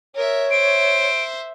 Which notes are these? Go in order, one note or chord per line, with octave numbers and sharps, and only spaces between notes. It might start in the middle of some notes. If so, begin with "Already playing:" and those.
A#4 C#5 E5
C5 E5 D7